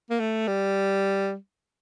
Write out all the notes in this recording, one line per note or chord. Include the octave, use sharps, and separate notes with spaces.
A#3
A3
G3